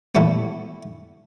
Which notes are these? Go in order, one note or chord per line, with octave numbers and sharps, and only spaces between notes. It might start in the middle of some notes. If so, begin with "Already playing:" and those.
A#2 E3 G3 A3 B3